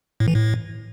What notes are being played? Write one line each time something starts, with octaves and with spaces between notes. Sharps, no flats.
A2
E3
A2